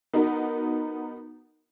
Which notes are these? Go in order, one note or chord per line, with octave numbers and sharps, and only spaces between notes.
B3 D#4 F#4 A#4